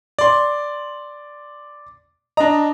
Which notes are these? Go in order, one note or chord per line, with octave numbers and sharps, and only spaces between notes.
D5 C6
D4 D#5 A#5